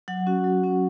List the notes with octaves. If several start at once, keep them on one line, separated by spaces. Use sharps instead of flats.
F#3 F#5
C#4 F#4
F#3
C#4 F#4